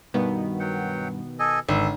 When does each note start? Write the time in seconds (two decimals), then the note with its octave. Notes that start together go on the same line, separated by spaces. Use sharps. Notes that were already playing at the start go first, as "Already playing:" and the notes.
0.14 G2 B2 D#3 B3
0.60 F#3 F#5 G5
1.39 A4 D#5 G#5
1.69 G#1 D3 A4